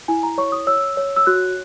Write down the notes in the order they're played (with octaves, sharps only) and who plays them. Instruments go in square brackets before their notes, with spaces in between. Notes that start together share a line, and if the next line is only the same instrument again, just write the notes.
[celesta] E4 G#5
A#5
C#5 C#6
D#6
C#5 E6
C#5
E6
F#4 F#6